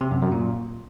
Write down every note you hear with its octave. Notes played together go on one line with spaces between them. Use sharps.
C3
F#2
F#2
A#2